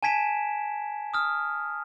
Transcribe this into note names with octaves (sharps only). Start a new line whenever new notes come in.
G#5 A5 G#6 B6 D7 E7
D#6 F6